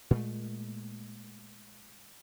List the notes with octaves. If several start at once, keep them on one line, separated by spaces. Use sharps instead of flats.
A#2 G#3 A3